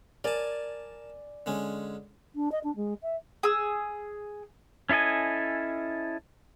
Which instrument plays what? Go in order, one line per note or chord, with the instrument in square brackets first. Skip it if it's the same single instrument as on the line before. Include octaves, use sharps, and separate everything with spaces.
[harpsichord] A#4 A5 [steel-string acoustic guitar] D5 G#5
[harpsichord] D3 G#3 C#4
[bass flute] D4
D#5
D4
G#3
E5
[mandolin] G#4 E6
[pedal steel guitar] C#4 E4 A4 D#5 G#5